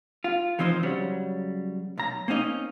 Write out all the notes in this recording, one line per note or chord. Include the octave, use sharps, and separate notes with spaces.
F4
E3 F3 C4 D#4 C5
C#3 F#3 G3
B1 A#5
A#3 C4 C#4 D#4 D#5